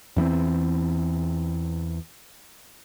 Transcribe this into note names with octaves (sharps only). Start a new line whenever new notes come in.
E2 E3 B3 C4